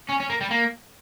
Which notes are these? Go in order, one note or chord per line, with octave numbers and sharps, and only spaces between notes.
C#4
C#4
A#3
G3
A#3